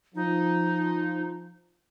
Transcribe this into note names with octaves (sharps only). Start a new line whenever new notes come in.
F3 D#4